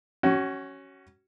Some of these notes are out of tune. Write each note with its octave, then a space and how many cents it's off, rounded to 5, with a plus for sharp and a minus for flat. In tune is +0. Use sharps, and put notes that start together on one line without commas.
C#4 +0 F#4 +30